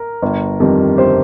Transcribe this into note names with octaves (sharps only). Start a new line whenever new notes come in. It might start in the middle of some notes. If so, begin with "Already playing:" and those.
Already playing: A#4
G1
F2 D#3 G3
G1 G4 C5